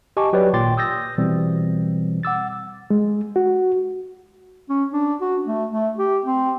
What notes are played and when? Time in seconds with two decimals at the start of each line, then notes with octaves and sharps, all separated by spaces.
0.17 G4 D#5 G#5 A5 C#6 D6
0.33 F#3 G4 B4 C#5 D5
0.53 G#1 A#2 G5 C6 D6 A6
0.77 D#6 E6 G6 A6 A#6
1.18 B2 E3 G3 C4
2.23 F#5 D6 E6 A6
2.90 G#3
3.36 F#4
4.69 C#4
4.93 D4
5.21 F#4
5.46 A3
5.70 A3
5.98 G4
6.25 C4